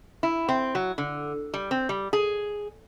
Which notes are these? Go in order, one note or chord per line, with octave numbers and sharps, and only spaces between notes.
E4
C4
F#3
D3
G3
C4
G3
G#4